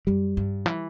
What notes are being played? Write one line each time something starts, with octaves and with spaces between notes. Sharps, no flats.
F#2 G3
G2
E3